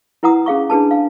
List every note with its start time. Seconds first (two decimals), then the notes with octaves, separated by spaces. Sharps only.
0.23 E4 B4 F#5 A#5 D#6
0.46 C#4 G#4 F5 C#6
0.70 D4 G#4 B4 A5
0.91 F5